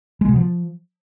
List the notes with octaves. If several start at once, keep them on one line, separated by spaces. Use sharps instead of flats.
G#3
B2
F3